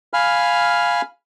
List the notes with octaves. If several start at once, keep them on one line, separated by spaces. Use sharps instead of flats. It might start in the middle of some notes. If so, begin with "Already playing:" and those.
F5 G#5 B5 F6